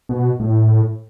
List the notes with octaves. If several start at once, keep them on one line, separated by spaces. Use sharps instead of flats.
B2
A2